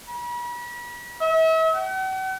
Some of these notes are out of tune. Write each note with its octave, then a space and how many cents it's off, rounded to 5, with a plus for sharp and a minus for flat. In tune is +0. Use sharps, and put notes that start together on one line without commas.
B5 -40
E5 -40
F#5 +45